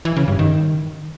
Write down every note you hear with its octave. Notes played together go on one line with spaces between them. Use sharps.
E3
C#3
G2
D#3